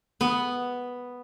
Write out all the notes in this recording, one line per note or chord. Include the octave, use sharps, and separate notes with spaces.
B3